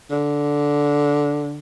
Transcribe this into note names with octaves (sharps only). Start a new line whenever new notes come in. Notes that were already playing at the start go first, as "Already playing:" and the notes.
D3